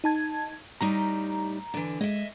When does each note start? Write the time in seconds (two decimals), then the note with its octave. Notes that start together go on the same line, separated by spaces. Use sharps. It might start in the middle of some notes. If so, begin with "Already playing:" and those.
0.04 D#4 A5 G#6
0.81 A2 G3 D#4 A#5
1.74 D3 E3
2.01 G#3 D#5 E5